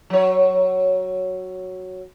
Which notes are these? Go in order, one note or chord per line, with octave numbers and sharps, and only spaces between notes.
F#3 C#5